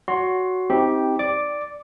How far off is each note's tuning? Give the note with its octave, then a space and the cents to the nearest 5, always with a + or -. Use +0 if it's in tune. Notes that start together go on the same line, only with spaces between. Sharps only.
F#4 +0 C#5 +30 C6 +15
C4 +0 D#4 +40 G4 +0
D5 +0 D6 +0